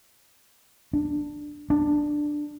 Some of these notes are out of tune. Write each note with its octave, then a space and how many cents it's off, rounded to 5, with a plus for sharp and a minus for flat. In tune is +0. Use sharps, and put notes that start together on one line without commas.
D4 +10
D4 +10